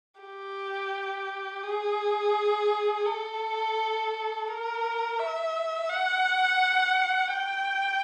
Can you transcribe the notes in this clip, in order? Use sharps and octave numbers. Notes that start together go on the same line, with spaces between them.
G4
G#4
A4
A#4
E5
F#5
G5